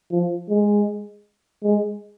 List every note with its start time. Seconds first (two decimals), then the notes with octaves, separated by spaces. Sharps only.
0.11 F3
0.50 G#3
1.64 G#3